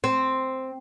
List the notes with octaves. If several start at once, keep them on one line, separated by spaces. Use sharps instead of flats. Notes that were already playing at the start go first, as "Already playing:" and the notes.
C4